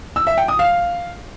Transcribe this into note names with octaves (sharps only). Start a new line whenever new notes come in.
E6
E5
G5
D#6
F5